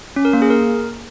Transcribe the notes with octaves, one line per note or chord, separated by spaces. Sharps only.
C#4
A#4
A#3
G#4
A#4